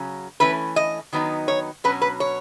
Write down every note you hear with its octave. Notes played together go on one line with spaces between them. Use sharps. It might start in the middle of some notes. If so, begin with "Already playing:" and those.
Already playing: C#3 F#3 C#4
E3 A3 C#4 B4
D#5
D#3 F#3 B3 D#4
C#5
B2 F#3 C#4 B4
B4
C#5